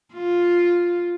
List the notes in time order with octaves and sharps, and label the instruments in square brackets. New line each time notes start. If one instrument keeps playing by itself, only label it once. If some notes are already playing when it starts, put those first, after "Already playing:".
[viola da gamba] F4